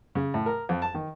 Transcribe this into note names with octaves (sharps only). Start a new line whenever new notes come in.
C#3
A2
A#4
F2
A5
D#3